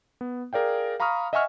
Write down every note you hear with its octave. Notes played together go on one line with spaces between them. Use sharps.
B3
G#4 A#4 D5 F5 G5
F5 A#5 B5 C#6 D#6 F6
D#5 E5 F#5 G#5 C#6 F6